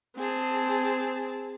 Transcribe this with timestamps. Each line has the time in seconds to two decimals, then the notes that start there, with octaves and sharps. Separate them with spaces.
0.17 C4 G#4 A5